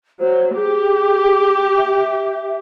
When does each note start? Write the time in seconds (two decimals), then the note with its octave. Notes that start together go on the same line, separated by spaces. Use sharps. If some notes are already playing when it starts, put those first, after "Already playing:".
0.20 F#3 C5
0.56 G4 G#4
1.78 E5